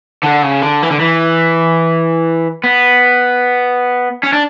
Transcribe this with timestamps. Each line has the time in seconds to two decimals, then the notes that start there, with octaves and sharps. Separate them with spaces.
0.23 D3
0.43 C#3
0.62 D3
0.83 E3
0.91 D3
1.00 E3
2.64 B3
4.24 C#4
4.33 D4